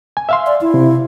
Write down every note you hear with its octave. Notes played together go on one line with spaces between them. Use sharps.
G#5
E5 F5 C6
D5
E4
C3